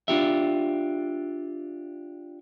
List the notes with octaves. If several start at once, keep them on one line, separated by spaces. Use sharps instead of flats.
D4 F4 G4 E5